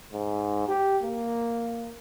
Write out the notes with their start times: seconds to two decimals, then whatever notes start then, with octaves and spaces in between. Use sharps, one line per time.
0.13 G#2
0.68 G4
1.03 A#3